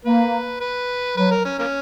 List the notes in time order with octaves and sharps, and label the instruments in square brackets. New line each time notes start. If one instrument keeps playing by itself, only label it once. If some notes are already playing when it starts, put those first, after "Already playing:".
[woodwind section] A#3 [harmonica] B4
[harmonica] B4
[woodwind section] F#3 [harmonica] B4
[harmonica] A#4
C#4
A#3 C#4